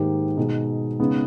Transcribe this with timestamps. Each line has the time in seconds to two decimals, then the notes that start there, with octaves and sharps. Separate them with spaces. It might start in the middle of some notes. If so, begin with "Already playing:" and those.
Already playing: G#2 D#3 A#3 D#4 G4
0.37 B2 G#3 D#4 G#4
0.99 C#3 G#3 B3 D#4